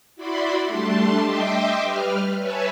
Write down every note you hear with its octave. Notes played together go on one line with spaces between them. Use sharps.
E4 F#4 D5 B5 C6
G3 A3 D4 A5 C6
D#5 E5 G5 C6 D6
G3 B4 F6
B4 C#5 E5 G#5 A5